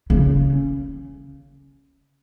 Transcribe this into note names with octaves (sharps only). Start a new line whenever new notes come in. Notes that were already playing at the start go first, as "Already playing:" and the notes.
C#3